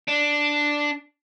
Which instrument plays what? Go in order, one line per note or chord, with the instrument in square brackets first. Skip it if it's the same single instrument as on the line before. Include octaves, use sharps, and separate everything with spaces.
[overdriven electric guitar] D4